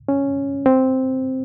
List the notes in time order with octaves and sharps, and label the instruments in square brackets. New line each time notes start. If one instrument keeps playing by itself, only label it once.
[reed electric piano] C#4
C4